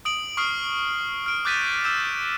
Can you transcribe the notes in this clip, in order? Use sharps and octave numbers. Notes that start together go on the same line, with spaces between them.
D#6 D7 F#7
C#6 D#6 F6 C7 D7
F6 D7
D6 F#6 G6 A6 B6 D#7
E6 G6 E7